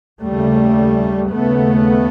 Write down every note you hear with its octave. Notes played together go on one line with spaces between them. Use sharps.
D#2 C#3 G3 A3
D#2 C#3 A3 B3